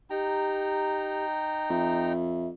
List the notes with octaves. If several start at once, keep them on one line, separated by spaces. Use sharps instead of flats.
D#4 G4 G5 A#5
F2 E5